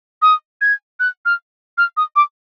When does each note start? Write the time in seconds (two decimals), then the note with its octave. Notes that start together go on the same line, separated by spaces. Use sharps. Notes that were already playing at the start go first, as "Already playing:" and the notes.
0.22 D#6
0.61 G#6
1.00 F#6
1.25 F6
1.78 F6
1.97 D#6
2.16 D6